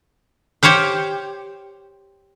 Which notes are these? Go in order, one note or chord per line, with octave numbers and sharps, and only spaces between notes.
G4 C5 C#5 F5 G5